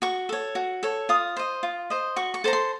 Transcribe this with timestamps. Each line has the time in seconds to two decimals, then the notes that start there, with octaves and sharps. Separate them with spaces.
0.02 F#4 C#6
0.29 A4 C#5
0.55 F#4
0.83 A4 C#5
1.09 F4 D#6
1.36 C5 D#5
1.63 F4
1.90 C5 D#5
2.16 F#4 C#6
2.34 C#6
2.44 A4 C5 A#5
2.53 C6